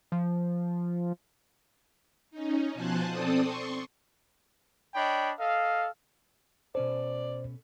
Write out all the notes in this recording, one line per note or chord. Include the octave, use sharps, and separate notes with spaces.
F3
C#4 D#4
B2 F3 C5 G#5 A5 F#6
C4 A4 D5 D#6
C6 C#6
D4 C#5 D#5 G5 B5
A4 D#5 F5
B2 C#4 A4 C5 D5